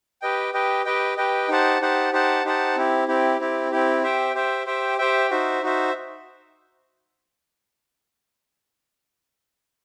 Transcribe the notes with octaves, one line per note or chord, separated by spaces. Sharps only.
G4 B4 D#5 G5
G4 B4 D#5 G5
G4 B4 D#5 G5
G4 B4 D#5 G5
D#4 G4 C5 F#5 A5
D#4 G4 C5 F#5 A5
D#4 G4 C5 F#5 A5
D#4 G4 C5 F#5 A5
C4 E4 G4
C4 E4 G4
C4 E4 G4
C4 E4 G4
G4 C5 E5 G5
G4 C5 E5 G5
G4 C5 E5 G5
G4 C5 E5 G5
D#4 F#4 C5 E5
D#4 F#4 C5 E5